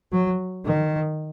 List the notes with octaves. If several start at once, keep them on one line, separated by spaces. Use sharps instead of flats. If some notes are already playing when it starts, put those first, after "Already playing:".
F#3
D#3